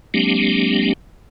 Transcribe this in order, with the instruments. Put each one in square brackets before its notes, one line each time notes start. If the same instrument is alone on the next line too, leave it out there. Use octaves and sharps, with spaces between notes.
[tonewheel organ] F#3 G#3 A#3 C4 D4 G4